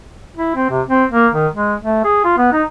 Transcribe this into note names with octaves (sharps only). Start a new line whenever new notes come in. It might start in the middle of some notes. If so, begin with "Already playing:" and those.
E4
C4
C3
C4
A#3
D#3
G#3
A3
G#4
F4
B3
D#4